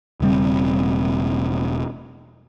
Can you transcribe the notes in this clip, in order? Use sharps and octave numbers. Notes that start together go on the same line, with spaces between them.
E1 C#3 G3 C4